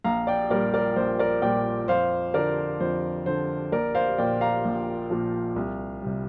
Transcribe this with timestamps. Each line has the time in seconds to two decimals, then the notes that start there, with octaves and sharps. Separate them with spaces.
0.04 A#1 F5 A#5
0.27 D5 G5
0.50 A#2 G3 A#4 D5
0.74 A#4 D5
0.96 A#1 C5
1.19 A#4 D5
1.42 A#2 G3 D5 G5
1.88 F2 C5 F5
2.34 D3 F3 A#4 D5
2.80 F2 C5
3.26 D3 F3 C5
3.72 A#1 A#4 D5
3.95 C5 F5
4.18 A#2 F3 D5 G5
4.41 F5 A#5
4.65 A#1
5.10 A#2 F3
5.56 C2
6.02 C3 G3